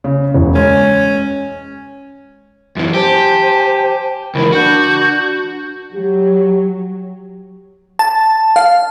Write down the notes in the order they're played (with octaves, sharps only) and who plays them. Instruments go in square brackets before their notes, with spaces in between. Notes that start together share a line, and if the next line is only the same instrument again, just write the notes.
[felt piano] C#3
E1
[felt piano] G#3 [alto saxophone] C#4
[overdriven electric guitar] F#2 E3
[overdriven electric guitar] G4 [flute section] C5 G#5 A5
[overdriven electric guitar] C#2 E3 [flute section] A#4 B5
[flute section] D4 G6 [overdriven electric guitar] F#4
[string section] F#3 [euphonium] G4
[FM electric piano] A5
F5